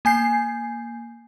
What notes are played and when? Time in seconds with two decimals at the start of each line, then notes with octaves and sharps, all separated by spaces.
0.05 A#3 G#5 G6 C7